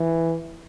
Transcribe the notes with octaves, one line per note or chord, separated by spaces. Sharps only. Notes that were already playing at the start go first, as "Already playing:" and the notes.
Already playing: E3